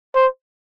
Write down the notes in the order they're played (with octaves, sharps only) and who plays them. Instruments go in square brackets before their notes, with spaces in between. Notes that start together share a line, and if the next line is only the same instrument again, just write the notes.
[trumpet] C5